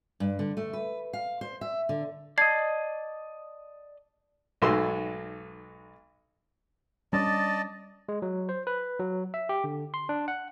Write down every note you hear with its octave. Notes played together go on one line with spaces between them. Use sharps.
G2
D3
A3
B4
F5
C5
E5
D3
D5 D#5 A5 G#6 C7
B1 G#2 A3 F#4 C6 E6
G3 C#4 D4 D5 D#5 A5
G#3
F#3
C5
B4
F#3
E5
G4
D3
C6
D4
F#5